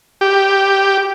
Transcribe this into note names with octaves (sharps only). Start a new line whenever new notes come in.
G4